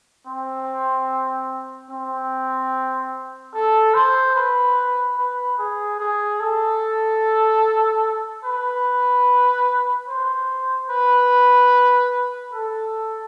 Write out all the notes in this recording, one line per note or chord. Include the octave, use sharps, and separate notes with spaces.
C4
C4
A4
C5
B4
B4
G#4
G#4
A4
B4
C5
B4
A4